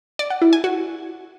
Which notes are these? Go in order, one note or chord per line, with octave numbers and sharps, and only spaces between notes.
D5
F#5
E4
G#5
F#4